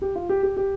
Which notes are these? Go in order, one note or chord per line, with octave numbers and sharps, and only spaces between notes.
G4
F4
G4
G4
G4